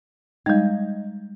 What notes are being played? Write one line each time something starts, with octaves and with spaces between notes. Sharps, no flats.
G3 G#3 D#4